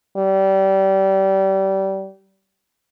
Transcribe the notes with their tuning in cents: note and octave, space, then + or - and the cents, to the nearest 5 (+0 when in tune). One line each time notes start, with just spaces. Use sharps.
G3 -25